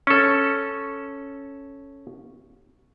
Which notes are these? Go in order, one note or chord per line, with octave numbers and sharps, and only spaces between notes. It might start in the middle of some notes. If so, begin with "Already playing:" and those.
C#4 A4